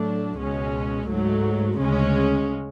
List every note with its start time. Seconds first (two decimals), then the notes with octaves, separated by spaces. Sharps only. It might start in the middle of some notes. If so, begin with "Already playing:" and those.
Already playing: A2 F#3 A3 D4
0.39 C#2 B2 G#3 C#4
1.08 G#2 F#3 A3
1.78 D2 C#3 G#3 C#4